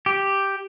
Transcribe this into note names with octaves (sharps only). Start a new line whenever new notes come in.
G4